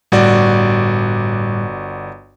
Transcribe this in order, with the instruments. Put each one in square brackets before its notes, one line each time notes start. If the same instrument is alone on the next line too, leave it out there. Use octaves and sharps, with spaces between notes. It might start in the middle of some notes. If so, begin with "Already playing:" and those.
[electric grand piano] G1 F#4 D5 [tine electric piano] A2 G3